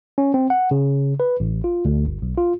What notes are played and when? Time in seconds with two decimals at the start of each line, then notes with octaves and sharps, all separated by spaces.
0.18 C#4
0.34 C4
0.50 F#5
0.71 C#3
1.20 B4
1.40 A1
1.64 F4
1.85 D2
2.06 G1
2.22 B1
2.38 F4